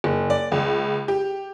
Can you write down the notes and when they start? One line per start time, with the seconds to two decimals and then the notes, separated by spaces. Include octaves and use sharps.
0.04 F#1
0.30 D5
0.52 C#2
1.08 G4